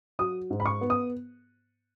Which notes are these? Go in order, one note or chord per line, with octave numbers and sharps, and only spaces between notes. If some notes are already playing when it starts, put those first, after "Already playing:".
F#3 D#6
G#2
B5
C#6
B3
D#6